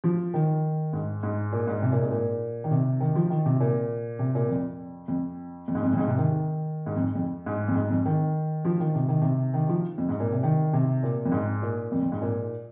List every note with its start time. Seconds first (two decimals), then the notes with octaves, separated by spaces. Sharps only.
0.04 F3
0.34 D#3
0.93 G#2
1.23 G#2
1.52 A#2
1.67 G#2
1.82 C3
1.92 A#2
2.01 G#2
2.11 A#2
2.64 D#3
2.71 C3
3.00 D#3
3.16 F3
3.30 D#3
3.46 C3
3.60 A#2
4.19 C3
4.35 A#2
4.49 F2
5.08 F2
5.68 F2
5.75 G#2
5.82 F2
5.93 F2
5.98 G#2
6.07 C3
6.18 D#3
6.86 G#2
6.96 F2
7.15 F2
7.46 G#2
7.68 F2
7.75 G#2
7.90 F2
8.06 D#3
8.65 F3
8.80 D#3
8.95 C3
9.08 D#3
9.22 C3
9.54 D#3
9.69 F3
9.98 F2
10.09 G#2
10.20 A#2
10.32 C3
10.43 D#3
10.73 C3
11.03 A#2
11.25 F2
11.32 G#2
11.62 A#2
11.92 F2
12.02 F2
12.12 G#2
12.22 A#2